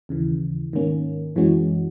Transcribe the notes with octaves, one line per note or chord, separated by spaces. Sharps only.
D#2 C#3 E3
G#2 D#3 A#3 C#4
F#2 E3 G#3 C#4 F#4